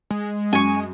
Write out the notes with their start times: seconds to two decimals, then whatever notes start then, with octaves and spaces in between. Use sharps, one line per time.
0.11 G#3
0.53 F#2 G#5 C#6